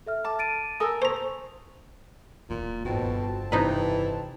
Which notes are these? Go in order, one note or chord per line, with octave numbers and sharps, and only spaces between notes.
A4 E5 F6
A5 D6
A6 D7 D#7
A4 A#4 G#5 D#6 E6
C5 A#5 C#6
D1 E2 A#2
F2 G#2 B2 C4 C#4 A5
G1 C#3
C3 E3 D#4 B4